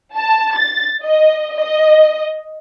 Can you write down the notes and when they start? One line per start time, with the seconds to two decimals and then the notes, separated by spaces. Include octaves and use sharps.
0.14 A5
0.55 A6
1.04 D#5
1.57 D#5